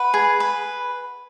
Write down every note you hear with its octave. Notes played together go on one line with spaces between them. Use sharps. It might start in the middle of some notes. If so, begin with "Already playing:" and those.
Already playing: B4 F#5
G#4
B4